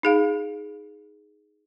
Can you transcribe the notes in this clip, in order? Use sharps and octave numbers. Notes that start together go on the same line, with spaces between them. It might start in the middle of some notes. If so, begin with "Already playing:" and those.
D#4 G#4 F5